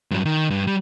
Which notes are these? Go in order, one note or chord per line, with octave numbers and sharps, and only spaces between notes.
G2 F#3
D#3
G2
G3